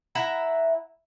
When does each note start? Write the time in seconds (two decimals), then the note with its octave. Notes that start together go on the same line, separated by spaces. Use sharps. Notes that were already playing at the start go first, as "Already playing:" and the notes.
0.15 E4 E5 F#5 A#5